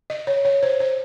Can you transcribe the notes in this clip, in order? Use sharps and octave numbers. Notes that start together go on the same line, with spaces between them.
D#5
C#5
C#5
C5
C5